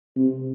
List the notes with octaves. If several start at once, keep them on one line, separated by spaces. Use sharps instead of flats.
C3